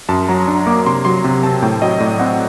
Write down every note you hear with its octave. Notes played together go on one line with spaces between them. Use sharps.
F#2 A5
F#3 A#5
D4
A#3 D6
C3 C6
F#3 C6
C3
C4 A5
A2 G5
F#3 D#5
A2 D5
C4 F#5